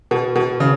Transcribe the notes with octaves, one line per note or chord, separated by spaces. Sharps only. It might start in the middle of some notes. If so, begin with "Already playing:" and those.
B2
B2
C#3